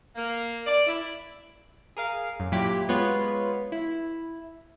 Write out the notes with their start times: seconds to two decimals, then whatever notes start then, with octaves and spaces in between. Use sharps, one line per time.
0.16 A#3
0.65 D5
0.87 E4
1.97 G#4 A#4 F5
2.40 F#2
2.52 A#2 F#3 E4 G4
2.89 G#3 B3 F4 B4 C#5
3.72 E4